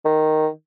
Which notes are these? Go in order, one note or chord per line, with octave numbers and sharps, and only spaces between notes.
D#3